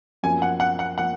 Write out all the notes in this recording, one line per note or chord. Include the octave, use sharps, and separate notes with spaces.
F#2 F3 A#3 G#5
F#5
F#5
F#5
F3 A#3 F#5